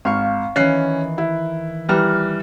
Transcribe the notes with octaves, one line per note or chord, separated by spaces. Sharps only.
G#1 F5 C#6
D#3 E3 C#4 F#6 C7
E4
E3 G3 A#5 F6 F#6